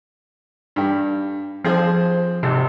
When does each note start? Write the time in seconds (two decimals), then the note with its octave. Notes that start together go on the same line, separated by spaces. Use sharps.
0.76 G2 G4
1.64 F3 C4 G#4 C5
2.43 G#1 C3